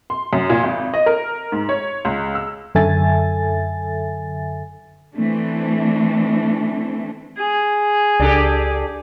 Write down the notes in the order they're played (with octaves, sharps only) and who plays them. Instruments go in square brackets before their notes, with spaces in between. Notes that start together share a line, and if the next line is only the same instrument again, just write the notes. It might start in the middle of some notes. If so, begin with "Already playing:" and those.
[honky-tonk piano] C6
F#2
A#2
G#1
D#5
A#4
G#2
C#5
C#2
E6
[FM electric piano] F#2 D3 A4 E5 G#5 A6
[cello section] E3 A3 C4 D4
[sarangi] G#4
[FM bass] C#2 [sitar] D4 G4 A4